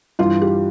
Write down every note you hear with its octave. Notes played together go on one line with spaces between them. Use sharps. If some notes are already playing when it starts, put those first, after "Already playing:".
G2 E3 F4
G4